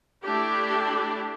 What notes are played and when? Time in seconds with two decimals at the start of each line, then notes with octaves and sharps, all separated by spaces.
0.23 A3 D4 E4 G4